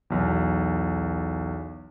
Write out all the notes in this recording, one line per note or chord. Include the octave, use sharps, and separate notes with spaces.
B1 E2